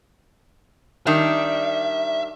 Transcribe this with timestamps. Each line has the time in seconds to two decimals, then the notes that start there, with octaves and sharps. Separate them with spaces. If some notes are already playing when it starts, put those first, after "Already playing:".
1.07 D#3 G3 D4 E5